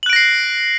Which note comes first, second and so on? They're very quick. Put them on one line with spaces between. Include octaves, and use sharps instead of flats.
F#7 F#6 D7 A#6 C7